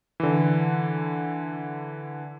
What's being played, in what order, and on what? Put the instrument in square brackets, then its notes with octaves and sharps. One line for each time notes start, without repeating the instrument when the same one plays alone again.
[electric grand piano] D3 E3